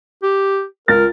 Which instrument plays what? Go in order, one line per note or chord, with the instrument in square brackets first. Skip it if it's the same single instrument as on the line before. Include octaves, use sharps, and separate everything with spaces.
[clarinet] G4
[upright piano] C#2 F4 A6 [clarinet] A#4